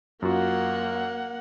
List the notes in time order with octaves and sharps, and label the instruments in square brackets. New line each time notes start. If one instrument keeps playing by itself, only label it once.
[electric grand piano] F#2 F4 F#4 [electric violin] A#3 F#5